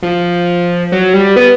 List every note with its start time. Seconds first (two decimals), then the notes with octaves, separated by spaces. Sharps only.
0.02 F3
0.92 F#3
1.14 G3
1.36 B3